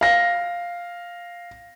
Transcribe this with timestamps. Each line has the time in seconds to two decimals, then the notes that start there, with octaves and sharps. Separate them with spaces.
0.01 F5 A#6